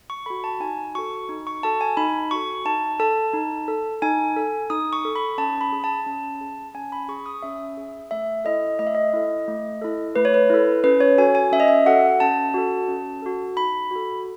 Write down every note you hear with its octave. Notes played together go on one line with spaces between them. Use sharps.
C#6
F#4 A4 B5
A5
D#4 G#5
F#4 A4 C#6
D#4
C#6
F#4 A4 A5
G#5
D#4 B5
F#4 A4 C#6
D#4 A5
A4 A5
D#4
A4
D#4 G#5
A4
D#4 D#6
C#6
A4
B5
C#4 A5
B5
G#4
A5
C#4
G#4
C#4 G#5
B5
G#4 C#6
D#6
C#4 E5
G#4
A3 E5
E4 A4 D#5
A3 D#5
E5
D#5
E4 A4
A3
E4 A4
A3 B4
C#5
B4
E4 A4
C#4 B4
C#5
F#4 A4 G#5
G#5
C#4 E5
D#5
E5
F#4 A4 F#5
C#4 A5
F#4 A4
C#4
F#4 A4
D#4 B5
F#4 A4